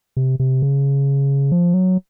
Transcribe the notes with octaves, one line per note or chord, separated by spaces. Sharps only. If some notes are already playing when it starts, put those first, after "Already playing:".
C3
C3
C#3
F3
F#3